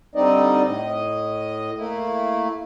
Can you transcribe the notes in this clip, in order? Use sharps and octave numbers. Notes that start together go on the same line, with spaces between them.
D3 G3 C4 D#4 D5 D#5
A2 D#5
A3 A#3 E4